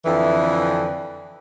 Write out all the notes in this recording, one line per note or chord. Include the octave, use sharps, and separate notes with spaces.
F2 D3 E3